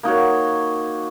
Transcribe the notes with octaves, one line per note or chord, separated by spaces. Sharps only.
A#3 D#4 F#4 C#5